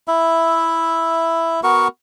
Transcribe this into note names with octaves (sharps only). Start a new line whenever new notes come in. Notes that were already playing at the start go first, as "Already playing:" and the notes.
E4 E5
B3 F#4 A#4 C#6